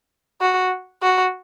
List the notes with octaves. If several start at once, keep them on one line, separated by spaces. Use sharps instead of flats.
F#4
F#4